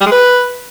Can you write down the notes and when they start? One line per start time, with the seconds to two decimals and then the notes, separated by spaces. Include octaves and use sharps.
0.01 G3
0.06 G#3
0.11 B4